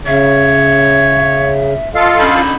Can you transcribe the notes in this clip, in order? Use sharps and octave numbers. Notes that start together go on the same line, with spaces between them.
C#3 C#5 E5
F4 A4 D#5 F5
D3 C#4 D#4 B5